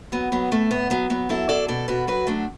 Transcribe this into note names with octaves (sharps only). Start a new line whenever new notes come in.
F#3 B3
F#3 B3
A2 A3
A2 B3
F#3 B3
F#3 B3
F#3 E4 A4
F#3 A4 D5
B2 A4 D5
B2 F#4 B4
F#3 F#4 B4
F#3 A3 D4